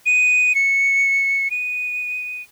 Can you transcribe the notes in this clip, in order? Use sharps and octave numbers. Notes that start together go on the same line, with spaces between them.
D#7
C#7
D#7